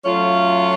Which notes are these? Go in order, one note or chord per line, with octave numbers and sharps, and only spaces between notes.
F#3 A3 C#4 F4